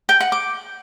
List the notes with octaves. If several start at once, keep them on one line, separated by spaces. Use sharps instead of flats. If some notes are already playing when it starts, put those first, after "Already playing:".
G5
F#5
D6